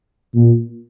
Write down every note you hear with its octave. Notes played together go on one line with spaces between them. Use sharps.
A#2